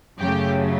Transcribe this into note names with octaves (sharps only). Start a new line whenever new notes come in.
F#2 C#3 F#3 A3 G4